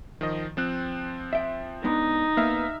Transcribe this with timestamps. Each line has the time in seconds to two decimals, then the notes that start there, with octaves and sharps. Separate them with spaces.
0.21 D#3 F3 D#5
0.57 F3 C4 F#6
1.33 E5 G5
1.84 G#3 B3 D4 D#4
2.37 A#3 B3 E5 F5 F6